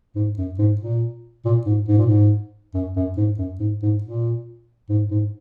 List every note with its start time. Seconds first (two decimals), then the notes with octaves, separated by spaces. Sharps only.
0.16 G#2
0.38 F#2
0.59 G#2
0.81 A#2
1.45 A#2
1.66 G#2
1.88 G#2
1.98 A#2
2.06 G#2
2.74 F#2
2.96 F#2
3.17 G#2
3.38 F#2
3.60 G#2
3.82 G#2
4.04 A#2
4.89 G#2
5.11 G#2